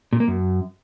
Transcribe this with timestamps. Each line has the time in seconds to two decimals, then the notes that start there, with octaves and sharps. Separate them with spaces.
0.13 A#2
0.20 A#3
0.28 F#2